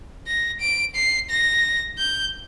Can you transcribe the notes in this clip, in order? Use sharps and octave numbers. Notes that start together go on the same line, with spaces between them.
A#6
D7
C7
A#6
G6